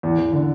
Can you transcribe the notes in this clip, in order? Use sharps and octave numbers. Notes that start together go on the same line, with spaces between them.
E2
E2
D3